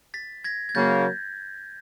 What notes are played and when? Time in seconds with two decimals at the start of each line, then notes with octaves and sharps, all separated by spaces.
0.14 A6 B6
0.44 G#6 A#6
0.69 G#6
0.75 C#3 F#3 A#3 G6 A6